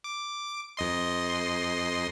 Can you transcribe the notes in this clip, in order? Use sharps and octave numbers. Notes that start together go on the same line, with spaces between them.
D6
F2 D#5 C6